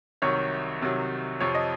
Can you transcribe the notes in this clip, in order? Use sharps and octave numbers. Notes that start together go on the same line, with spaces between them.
C2 C3 D#3 F#3 C#5
C2 C3 D#3 F#3
F2 C3 F3 C#5
D#5